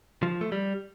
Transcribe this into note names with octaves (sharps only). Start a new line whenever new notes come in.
F3
A3
G3